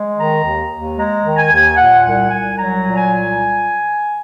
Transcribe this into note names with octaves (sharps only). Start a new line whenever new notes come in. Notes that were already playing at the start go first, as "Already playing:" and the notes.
Already playing: G#3
D#3 A#5
D#2
D#2
G#3 A#5
D#3
G#5
D#2
A#2 F#5
C2 F#5
C2 G#5
F#3 A#5
A#2
G#5
C2